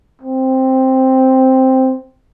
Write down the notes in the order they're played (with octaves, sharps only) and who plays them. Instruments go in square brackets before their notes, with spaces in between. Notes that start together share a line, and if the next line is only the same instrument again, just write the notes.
[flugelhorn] C4